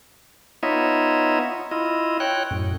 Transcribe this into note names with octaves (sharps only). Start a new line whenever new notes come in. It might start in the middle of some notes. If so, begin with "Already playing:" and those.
B3 D#4 F4 C#5 D#5 E5
E4 F4 D#5
C#5 G5 F#6
F#2 A2